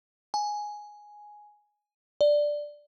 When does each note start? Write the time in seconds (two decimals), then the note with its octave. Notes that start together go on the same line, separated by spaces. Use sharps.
0.34 G#5
2.21 D5